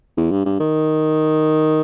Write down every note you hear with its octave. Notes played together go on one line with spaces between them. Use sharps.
E2
G2
G2
D#3